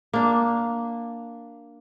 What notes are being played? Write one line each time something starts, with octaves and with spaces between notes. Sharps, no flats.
A#3 D4